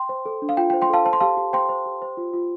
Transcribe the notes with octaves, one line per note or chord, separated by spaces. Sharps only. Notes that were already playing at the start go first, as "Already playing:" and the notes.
Already playing: G5 C6
C5
A4
D4
F5
F4 G5
G5
C5
G5 C6
A4 F5 A5
C5 A5
C6
G4 F5 A5
G4
C5 G5 C6
C5
G4
C5
F4
F4